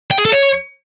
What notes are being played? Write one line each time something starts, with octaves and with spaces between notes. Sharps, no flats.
G5
G#4
A4
C#5